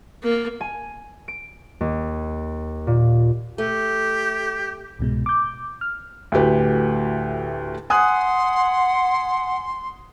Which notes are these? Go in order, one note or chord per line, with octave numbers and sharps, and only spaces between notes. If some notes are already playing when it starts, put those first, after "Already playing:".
A#3
G#5
D7
D#2
A#2
A3 G4
C2 G#2 B2 G#3
D6 G6
F6
D2 A2 F#4 G4 B4
F#5 G#5 C6 D#6 F#6